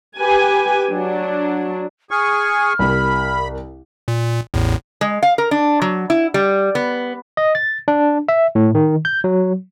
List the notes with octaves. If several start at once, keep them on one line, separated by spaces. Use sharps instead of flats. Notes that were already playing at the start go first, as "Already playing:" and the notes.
G4 B4 G#5
F#3 D4
G#4 G#5 C#6 F6
C2 G4 A#4 B5
A#2
A1 E2 A2
G#3
F5
A#4
D4
F#3
E4
G3
B3
D#5
A6
D4
E5
A2
D#3
G6
F#3